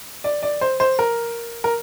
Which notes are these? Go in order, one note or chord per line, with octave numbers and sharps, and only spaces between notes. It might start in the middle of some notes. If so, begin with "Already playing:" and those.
D5
D5
C5
C5
A#4
A#4